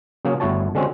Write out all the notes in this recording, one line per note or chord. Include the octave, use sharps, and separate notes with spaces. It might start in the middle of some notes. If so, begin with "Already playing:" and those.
C#3 F#3 A#3 C#4 G#4
G1 A3 E4 F#4 C#5 A5
D3 G#3 C4 C#4 F#4